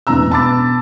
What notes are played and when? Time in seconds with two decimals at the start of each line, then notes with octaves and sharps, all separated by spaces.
0.07 E1 A1 E3 D4 A#5 E6
0.30 B2 A5 B5 D6 A6